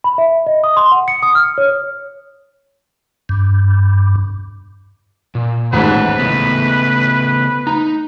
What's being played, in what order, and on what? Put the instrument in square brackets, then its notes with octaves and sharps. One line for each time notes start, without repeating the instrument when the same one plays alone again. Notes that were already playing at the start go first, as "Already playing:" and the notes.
[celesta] B5
E5
D#5
D#6
C6
F#5
C#7
D#6
F6
C#5
[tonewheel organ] G2
[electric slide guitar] A#2
[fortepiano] A1 D#2 G#2 [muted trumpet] B4 [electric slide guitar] C5 F#5
[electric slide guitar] C#3 A3 B3
[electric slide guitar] D#4 [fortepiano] A#5